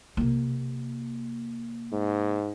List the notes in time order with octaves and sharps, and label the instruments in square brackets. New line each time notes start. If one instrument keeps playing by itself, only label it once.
[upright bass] C3 A#3
[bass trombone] G#2